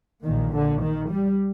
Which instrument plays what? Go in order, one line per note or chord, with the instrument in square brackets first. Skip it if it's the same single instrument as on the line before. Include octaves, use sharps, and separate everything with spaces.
[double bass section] A#1 A#2 D#3
D3
D#3
G3